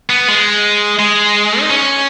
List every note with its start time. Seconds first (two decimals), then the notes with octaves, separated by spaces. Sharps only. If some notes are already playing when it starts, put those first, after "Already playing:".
0.10 B3
0.28 G#3
0.99 G#3
1.60 D#4
1.70 C#4